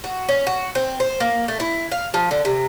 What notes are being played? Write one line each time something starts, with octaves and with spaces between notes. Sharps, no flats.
F#4
C#4
F#4
C4
C5
A#3
A3
E4
F5
F3
D3
C3